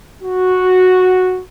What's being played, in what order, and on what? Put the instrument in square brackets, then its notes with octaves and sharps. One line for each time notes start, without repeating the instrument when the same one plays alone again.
[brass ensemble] F#4